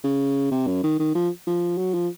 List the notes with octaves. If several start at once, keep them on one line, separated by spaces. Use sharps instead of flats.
C#3
C3
F#2
D#3
D#3
F3
F3
F#3
F3